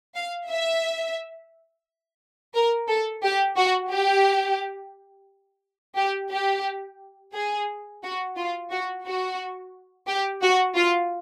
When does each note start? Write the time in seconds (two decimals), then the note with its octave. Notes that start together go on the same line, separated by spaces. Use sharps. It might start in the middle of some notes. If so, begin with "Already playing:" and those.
0.15 F5
0.49 E5
2.54 A#4
2.88 A4
3.24 G4
3.57 F#4
3.91 G4
5.96 G4
6.31 G4
7.34 G#4
8.03 F#4
8.36 F4
8.71 F#4
9.06 F#4
10.07 G4
10.42 F#4
10.76 F4